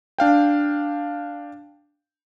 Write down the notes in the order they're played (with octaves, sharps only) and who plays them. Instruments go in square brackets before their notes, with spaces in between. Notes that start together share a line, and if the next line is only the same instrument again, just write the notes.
[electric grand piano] D4 F5 G5